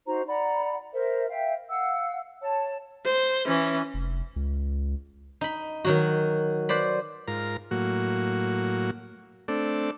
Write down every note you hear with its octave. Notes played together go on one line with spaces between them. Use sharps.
D#4 F#4 C5 A#5
D5 F#5 A#5 B5
A#4 C5 E5
E5 F5 G5
F5 F#5 E6
C#5 A5
C5
E3 C#4
F1
C#2
D#4 B5
D#3 F#3 F#4
B4 C5 D5 B5
G#2 F4 A#4 A#5
A2 F#3 A#3 F#4
A3 C4 D4 A4 D5